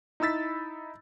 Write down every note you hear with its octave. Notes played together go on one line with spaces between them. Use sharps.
D#4 E4 B5 E6 A6 B6